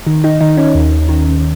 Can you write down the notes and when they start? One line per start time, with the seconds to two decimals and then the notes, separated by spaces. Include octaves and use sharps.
0.07 D#3
0.24 D#4
0.41 D#3 D#4
0.57 C#4
0.75 D#2
1.09 D#3